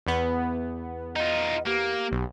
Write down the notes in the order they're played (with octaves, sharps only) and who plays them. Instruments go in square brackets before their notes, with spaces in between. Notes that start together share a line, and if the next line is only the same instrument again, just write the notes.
[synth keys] E2 B3
[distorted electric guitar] D#4 F4 [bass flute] D#5
[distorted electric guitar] A#3 [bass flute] G4
[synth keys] B1